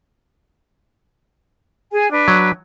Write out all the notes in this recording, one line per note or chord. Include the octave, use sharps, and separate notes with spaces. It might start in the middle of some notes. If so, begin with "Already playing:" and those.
G#4 G#5
D4 B4
F#3